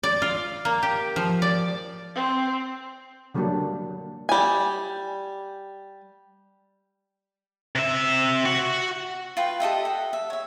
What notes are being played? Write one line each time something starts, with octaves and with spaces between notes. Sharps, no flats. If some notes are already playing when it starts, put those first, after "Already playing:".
D5
F4
A#3
G4
F3
D5
C4
D3 F#3 G3 A#3 D4
G3 G#5
C3 E5
F#4 F#5
F4 B4 G5
G4 A4 D#5 E5
A4 F#5
E5
C#5 E5